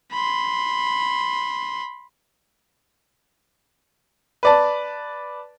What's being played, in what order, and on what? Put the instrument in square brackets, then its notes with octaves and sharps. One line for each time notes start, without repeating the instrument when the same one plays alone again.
[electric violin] B5 C6
[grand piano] B4 D5 A5